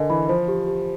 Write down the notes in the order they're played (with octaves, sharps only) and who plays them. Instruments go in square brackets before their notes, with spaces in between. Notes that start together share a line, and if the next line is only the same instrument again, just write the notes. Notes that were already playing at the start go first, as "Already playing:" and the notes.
Already playing: [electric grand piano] D3 [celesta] A#4 D#5 G#5
[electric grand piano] E3 [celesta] B5
[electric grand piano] F3 [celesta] C5
[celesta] G4
G4